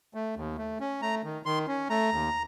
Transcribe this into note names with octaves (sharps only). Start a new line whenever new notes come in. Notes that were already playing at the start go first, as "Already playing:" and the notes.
A3
D#2
A3
C#4
A3 A#5
D#3
D#3 C6
C#4
A3 A#5
D#2